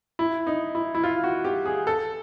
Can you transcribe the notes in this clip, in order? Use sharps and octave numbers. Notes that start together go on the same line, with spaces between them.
E4
D#4
E4
E4
F4
F#4
G4
G#4
A4